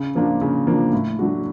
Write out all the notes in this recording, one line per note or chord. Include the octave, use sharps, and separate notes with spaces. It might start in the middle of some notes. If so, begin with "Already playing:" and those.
Already playing: C#3
F3 A#3 D4 F4
C#3
F3 A#3 D4 F4
A2
F#3 A3 D4 F#4